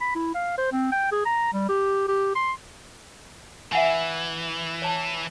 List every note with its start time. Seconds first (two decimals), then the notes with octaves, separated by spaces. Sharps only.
0.01 B5
0.15 E4
0.35 F5
0.58 C5
0.72 C4
0.92 G5
1.12 G#4
1.25 A#5
1.53 G3
1.69 G4
2.08 G4
2.35 C6
3.72 E3 E5 F#5 G#5
4.82 C#5 A5